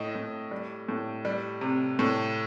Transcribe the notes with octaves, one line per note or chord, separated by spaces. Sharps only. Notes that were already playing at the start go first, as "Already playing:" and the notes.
Already playing: A2 D#5
A2
G3
A2
G3
C3
A2